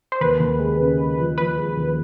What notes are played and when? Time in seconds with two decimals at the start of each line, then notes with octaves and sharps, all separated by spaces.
0.12 C5
0.21 D#2 B4
0.40 D#2
0.59 G#3
0.80 C#3
0.98 G#3
1.18 F3
1.37 F3 B4
1.57 G#3
1.77 D#2